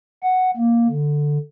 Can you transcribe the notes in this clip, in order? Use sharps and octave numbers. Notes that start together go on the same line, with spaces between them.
F#5
A#3
D3